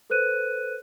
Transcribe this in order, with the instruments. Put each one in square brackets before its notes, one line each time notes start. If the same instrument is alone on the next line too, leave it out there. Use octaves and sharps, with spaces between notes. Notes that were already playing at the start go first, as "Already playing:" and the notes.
[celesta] A4 B4 C5 F#6 D#7